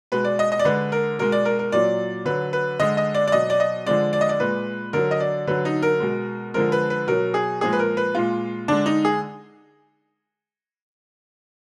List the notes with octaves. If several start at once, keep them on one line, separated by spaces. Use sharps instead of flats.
B2 G#3 B4
D5
D#5
D#5
D5
D3 G#3 B4
A#4
B2 G#3 A#4
D5
A#4
A#4
A#2 F#3 D5
D3 F#3 B4
B4
D3 G#3 D#5
D#5
D5
D5
B2 F#3 D#5
D5
D#5
D3 F3 G#3 D5
D5
D#5
D5
A#2 G#3 B4
D3 F#3 A#4
D#5
D5
D3 F#3 B4
D#4
A#4
B2 G#3
D3 F3 G#3 A#4
B4
B4
B2 F#3 A#4
G#4
A#2 F3 G#3 G#4
B4
A#4
B4
A#2 G#3 F4
D3 G#3 D4
D#4
G#4